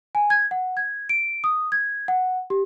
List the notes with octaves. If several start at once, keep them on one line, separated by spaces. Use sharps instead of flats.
G#5
G#6
F#5
G#6
D7
D#6
G#6
F#5
G4